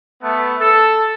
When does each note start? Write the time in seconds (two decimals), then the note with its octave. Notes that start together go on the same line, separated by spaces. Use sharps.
0.23 A3 B3
0.60 A4